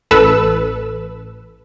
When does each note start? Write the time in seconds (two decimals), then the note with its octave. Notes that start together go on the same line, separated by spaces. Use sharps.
0.11 A1 A4 B4 E6